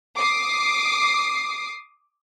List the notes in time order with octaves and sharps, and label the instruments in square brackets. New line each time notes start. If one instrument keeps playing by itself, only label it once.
[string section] D6 D#6 C7